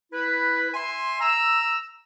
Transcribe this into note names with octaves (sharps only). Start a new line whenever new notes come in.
E4 B4
E5 G#5 C6
A#5 E6